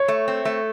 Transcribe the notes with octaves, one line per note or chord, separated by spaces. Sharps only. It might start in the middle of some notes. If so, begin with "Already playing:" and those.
Already playing: C#5
A3
C4
A3